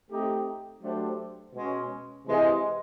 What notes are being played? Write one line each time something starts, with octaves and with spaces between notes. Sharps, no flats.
A3 C4 D#4 G4
F#3 A3 D4 G4 C5
B2 G#3 C#4
C3 E3 G#3